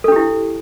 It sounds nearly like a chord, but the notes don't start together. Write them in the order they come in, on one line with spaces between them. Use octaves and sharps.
A4 D4 G4 E4